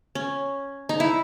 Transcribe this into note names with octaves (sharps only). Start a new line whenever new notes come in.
C#4
D#4
E4